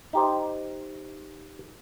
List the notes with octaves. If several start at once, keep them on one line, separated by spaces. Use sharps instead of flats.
D#4 G4 C5